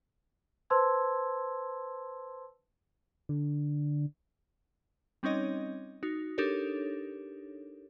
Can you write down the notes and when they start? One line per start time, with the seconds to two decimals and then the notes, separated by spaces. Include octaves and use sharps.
0.70 B4 C5 A5 C6 E6 G#6
3.29 D3
5.23 G3 C4 C#4 D#4 C#5 D#5
6.03 D#4 F#4
6.38 D4 D#4 G4 A4 A#4 C#5